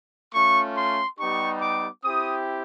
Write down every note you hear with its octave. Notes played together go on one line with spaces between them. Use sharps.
A3 C#4 F4 C#6
C6
G3 B3 D#4 G4 C#6
D6
C4 E4 G4 D#6